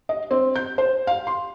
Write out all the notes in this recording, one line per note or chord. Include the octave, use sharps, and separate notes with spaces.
D#5
C4
G6
C5
F5
C6